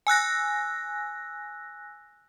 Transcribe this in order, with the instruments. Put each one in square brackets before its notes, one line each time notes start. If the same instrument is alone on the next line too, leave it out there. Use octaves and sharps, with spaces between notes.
[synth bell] G#5 E6 F#6 A#6